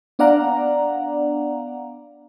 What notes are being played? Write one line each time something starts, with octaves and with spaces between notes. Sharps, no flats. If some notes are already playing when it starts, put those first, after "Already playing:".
B3 D4 D5 F5 F#5 A#5